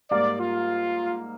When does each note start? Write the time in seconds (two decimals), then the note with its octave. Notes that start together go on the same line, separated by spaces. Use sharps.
0.11 G#2 G3 A#3 D5
0.39 F4